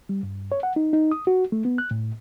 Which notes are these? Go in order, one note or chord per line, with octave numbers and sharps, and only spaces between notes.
G3
G2
C#5
F#5
D#4
D#4
D#6
F#4
A3
B3
F#6
A2